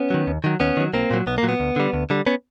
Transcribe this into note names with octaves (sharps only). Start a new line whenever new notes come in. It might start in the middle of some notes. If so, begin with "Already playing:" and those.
Already playing: B3 C#4
D#3 F#3
D#2
D#3 F#3
D#2 B3 C#4
D#3 F#3
B1 A#3 C4
A#2 F#3
B1 B3
A#3
A#2 F#3
B3
D2
D3 G3
D2
D3 G3
B3 C#4